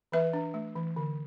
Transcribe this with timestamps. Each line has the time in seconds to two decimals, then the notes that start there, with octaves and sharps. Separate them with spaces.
0.12 E3 B4 E5
0.33 D4
0.54 A3
0.76 E3
0.96 D3